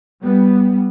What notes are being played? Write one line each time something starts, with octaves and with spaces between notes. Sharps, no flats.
G3 B3